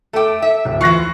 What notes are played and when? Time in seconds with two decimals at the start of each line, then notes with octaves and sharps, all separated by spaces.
0.13 A3 A4 G5 D6
0.42 E5
0.65 D1
0.81 E3 F4 C#6 F#6 A#6